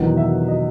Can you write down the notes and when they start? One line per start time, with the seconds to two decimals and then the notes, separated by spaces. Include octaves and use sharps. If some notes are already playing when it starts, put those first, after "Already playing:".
Already playing: E1 E2 D#3 F#3 B3 F#5
0.17 E5
0.48 D#5